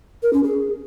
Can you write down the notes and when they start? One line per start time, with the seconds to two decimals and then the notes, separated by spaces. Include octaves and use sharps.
0.23 A#4
0.33 C#4
0.44 G#4